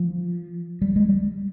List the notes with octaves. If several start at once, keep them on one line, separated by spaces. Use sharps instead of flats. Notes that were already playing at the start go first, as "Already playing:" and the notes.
Already playing: F3
G3
G#3
G3